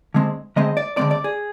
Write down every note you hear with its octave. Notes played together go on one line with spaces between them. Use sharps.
D3 G#3 C4
D3 G#3 C4 D#5
D5
D3 G#3 C4 D5
D5
G#4